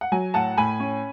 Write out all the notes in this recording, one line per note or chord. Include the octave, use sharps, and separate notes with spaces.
F#5
F#3 G#5
A2 F#5 A5
A2 G#5 B5
C#4